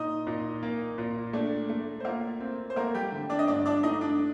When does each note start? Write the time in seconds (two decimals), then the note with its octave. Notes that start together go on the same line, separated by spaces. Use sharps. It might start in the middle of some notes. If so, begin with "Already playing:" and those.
Already playing: A#2 D#4 D#5
0.27 A#2
0.63 A#3
0.98 A#2
1.33 A3 D4 D5
1.69 A3
2.00 C5
2.05 A#3 F4 A#4
2.40 C4
2.70 C5
2.76 A3 A#3 A#4
2.94 G3 G4
3.12 D3
3.30 D4 D5
3.39 D#5
3.47 G2 D4 D5
3.65 D4 D5
3.83 A3 D#4 D#5
4.01 D4 D5